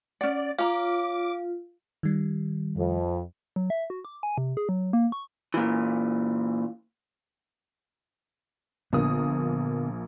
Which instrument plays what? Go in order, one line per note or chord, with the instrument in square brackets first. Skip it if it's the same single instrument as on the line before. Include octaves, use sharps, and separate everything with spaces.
[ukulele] C#4 F#5 [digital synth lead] D5
[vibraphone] F4 [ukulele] C#5 A#5 [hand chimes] F5 [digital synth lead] D6
[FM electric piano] D#3 G3
[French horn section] F2
[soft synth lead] F#3
E5
F#4
D6
G#5
C3
G#4
F#3
A#3
C#6
[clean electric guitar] A#2 E3
[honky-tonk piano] A#1 A#3 D#6 [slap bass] D3 B3